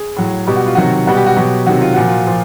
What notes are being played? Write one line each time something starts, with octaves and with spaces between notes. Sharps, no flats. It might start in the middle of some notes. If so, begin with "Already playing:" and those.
Already playing: G#4
A2 F#3
B2 G3 G4
F#4
F4
C3 D#3 F#3 F#4
B2 G3 F#4
G4
F#4
B2 F#3 G4
C3 D#3 F#3 F#4
F4
A#2 F3 F#4
F4
A#2 F3